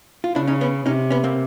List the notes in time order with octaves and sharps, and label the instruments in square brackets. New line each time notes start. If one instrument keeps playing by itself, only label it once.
[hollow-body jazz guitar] F4
[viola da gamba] C#3 [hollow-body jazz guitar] D4 E4
[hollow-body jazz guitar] C#4 D#4
B3 C#4
[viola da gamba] C3 [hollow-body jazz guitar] C#4 D#4
[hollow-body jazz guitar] B3 C#4
A#3 C4